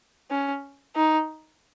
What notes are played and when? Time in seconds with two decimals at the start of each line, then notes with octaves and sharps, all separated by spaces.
0.30 C#4
0.95 D#4